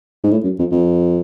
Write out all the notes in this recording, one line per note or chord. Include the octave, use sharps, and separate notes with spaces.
G#2
A2
F#2
F2
F2